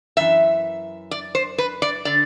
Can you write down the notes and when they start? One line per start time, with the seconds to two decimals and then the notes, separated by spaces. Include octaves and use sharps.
0.17 F#2 E3 E5
1.11 D5
1.35 C5
1.58 B4
1.82 D5
2.05 D3 D5